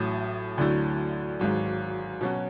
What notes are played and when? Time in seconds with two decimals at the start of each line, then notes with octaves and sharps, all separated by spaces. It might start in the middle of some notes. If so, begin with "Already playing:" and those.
Already playing: A1 A2 F#3
0.57 D2 D3 F#3 A3 E4
1.39 G#1 G#2 F#3
2.21 B2 F#3 C#4 F#4